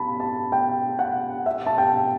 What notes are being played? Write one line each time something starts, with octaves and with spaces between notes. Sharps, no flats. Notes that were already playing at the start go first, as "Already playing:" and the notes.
Already playing: A5 B5
A5
G5
F#5
E5
A5
G5